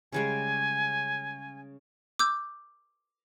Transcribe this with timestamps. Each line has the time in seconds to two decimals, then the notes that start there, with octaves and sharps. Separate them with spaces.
0.12 C#3 G3 G#3 G#5
2.19 D6 E6 G6